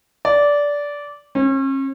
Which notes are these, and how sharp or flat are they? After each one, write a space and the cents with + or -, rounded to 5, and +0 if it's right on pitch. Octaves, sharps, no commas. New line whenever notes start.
D5 -15
C#4 -40